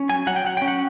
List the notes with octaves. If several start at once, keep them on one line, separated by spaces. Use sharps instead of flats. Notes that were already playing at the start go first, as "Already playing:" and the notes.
Already playing: C#4
F#3 G#5
F#3 F#5
G5
F#3 F#5
C#4 G5
F#5